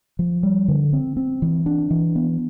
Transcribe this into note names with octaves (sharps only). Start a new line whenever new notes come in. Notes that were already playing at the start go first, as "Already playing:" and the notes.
F3
G3
D3
C4
C4
E3
D4
E3
B3